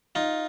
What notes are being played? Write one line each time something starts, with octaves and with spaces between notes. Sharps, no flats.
D#4 F4